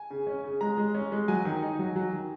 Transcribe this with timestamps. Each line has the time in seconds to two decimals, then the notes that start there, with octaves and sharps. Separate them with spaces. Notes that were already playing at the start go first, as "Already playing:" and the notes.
Already playing: G#5
0.10 C#3
0.27 C#4
0.44 C#3
0.61 G#3 A#5
0.78 G#3
0.95 C#4
1.12 G#3
1.28 F#3 G#5
1.45 D#3
1.62 D#4
1.79 F#3
1.96 F#3
2.13 D#3